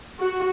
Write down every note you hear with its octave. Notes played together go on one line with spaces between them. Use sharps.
F#4